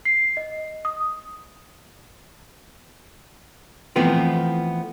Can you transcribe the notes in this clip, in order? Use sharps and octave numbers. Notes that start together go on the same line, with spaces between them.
C7
D#5
D#6
E3 F3 A3 B3 C4 F4